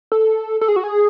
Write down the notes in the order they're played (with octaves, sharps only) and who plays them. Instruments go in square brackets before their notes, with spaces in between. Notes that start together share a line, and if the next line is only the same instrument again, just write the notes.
[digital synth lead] A4
A4
G#4
F#4
G#4